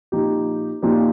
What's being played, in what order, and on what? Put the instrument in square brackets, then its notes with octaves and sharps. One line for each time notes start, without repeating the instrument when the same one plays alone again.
[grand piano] A#2 F3 D#4 G4
A#2 F3 D#4 G4